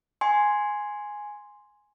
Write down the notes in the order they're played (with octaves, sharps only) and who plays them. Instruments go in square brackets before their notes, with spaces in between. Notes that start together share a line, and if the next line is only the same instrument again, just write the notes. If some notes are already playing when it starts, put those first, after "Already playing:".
[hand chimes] G#5 C6